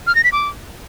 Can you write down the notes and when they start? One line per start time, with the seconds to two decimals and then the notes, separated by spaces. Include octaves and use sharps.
0.07 F6
0.15 A#6
0.24 B6
0.32 D6